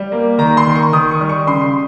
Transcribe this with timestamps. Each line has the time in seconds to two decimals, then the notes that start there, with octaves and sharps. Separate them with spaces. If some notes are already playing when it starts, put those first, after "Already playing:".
Already playing: G3
0.12 A#3
0.38 D#3 A#5
0.57 C6
0.67 D#3
0.75 C#6
0.93 D#3 D#6
1.11 C#6
1.21 G3
1.29 C#6
1.47 C#3 C6